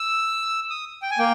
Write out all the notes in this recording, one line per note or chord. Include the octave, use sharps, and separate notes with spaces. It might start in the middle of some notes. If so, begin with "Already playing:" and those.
Already playing: E6
D#6
G5
G#5
A#3 G5